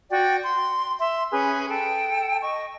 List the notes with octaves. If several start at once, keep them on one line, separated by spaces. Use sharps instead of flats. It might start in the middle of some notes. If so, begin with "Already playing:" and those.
F#4 D5 G5
C6
E5 C6
C#4 G#4 B4
A4 G5
D#5 C#6